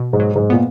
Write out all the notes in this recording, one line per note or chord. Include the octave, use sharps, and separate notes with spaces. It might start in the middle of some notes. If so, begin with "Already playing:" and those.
Already playing: B2
G#2
F#3
G#2
A#2 B3